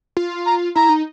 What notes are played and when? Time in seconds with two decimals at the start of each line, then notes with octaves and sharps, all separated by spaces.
0.17 F4
0.46 A#5
0.75 E4 A#5
0.89 D#4